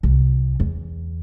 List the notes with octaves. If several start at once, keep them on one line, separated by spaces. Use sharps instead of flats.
C2
E2